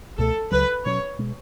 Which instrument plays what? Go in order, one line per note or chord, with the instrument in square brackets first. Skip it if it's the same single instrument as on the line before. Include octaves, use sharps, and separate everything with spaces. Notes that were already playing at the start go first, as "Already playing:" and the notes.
[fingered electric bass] C#2 B2 A3 [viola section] A4
[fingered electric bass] C#2 C#3 F#3 [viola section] B4
[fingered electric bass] B2 F#3 C#4 [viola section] C#5
[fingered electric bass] B2 G#3